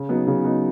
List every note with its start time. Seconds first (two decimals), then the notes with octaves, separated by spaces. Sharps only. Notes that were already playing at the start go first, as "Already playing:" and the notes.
Already playing: C#3
0.09 F#3 B3 D#4
0.27 C#3
0.44 F#3 B3 D#4